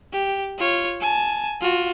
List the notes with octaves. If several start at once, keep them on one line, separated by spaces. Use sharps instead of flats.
G4
F4 C#5
G#5 A5
F4 F#4